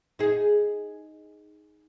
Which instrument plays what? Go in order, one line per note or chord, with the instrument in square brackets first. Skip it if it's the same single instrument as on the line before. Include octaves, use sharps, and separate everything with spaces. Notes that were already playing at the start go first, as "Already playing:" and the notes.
[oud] D#4 G#4